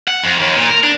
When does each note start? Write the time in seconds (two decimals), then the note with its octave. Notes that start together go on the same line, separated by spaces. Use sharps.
0.08 F#5
0.24 F2
0.39 D#2
0.56 A#2
0.69 A#4
0.83 D4